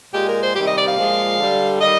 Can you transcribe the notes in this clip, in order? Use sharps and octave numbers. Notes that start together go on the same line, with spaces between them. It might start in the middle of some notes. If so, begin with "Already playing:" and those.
A#2 G#3 G4
A#4
C5
C3 D#3 G3 G4
D#5
D5
F5
A#2 F3 G#3
D3 G3
D#3 G3 D#5